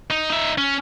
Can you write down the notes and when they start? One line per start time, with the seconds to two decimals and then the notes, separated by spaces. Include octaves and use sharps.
0.11 D#4
0.31 D#4 E5
0.58 C#4